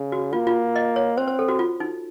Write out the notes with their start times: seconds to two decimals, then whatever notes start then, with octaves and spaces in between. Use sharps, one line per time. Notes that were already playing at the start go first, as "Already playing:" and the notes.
Already playing: C#3
0.12 F#4
0.33 A#3 F4
0.47 F4
0.76 D#5
0.96 C#5
1.17 C4 C5
1.28 C5
1.39 A4
1.49 F#4
1.59 F4
1.80 D#4